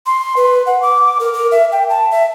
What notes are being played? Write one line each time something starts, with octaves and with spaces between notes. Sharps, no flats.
C6
B4
F#5
D6
A#4
A#4
E5
G5
A5
E5